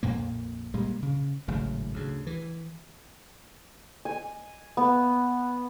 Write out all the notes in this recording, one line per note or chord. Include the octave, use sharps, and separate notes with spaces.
A#1 F2 A#2 A#3
A#2 G3 G#3
C#3
G#1 A2 C#3 F#3
D2 C#3
E3
G#5
B3